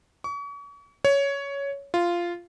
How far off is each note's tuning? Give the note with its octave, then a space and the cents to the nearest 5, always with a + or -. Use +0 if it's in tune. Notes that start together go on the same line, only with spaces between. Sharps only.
C#6 +40
C#5 +10
F4 -10